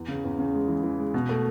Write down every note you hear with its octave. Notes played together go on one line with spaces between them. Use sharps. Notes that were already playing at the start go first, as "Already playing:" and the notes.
Already playing: E2
C#3
E2
C#3
G#3
E3
E3
G#3
B2
A3